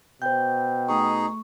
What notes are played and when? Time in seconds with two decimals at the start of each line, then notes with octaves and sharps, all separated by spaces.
0.22 B2 C5 G5 G6
0.89 A3 D#4 G#4 C#6